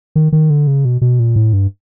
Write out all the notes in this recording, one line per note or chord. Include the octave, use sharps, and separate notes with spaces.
D#3
D#3
D3
C#3
B2
B2
A#2
A2
G2